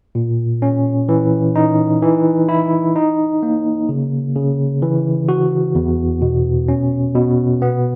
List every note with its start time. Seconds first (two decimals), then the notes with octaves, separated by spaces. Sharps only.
0.15 A#2
0.62 C#4
1.09 E3
1.56 D#4
2.02 E3
2.49 E4
2.96 D#4
3.43 A#3
3.89 C#3
4.35 C#3
4.82 E3
5.29 F#4
5.75 E2
6.22 B2
6.68 C#4
7.15 B2
7.62 B3